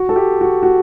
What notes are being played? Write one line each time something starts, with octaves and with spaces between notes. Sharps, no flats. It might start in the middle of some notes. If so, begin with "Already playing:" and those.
Already playing: F#4
A4
G4
F#4
F#4